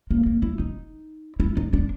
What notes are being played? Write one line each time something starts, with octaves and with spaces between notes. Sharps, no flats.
A#3
A#3
E4
D#4
E4
D#4
D4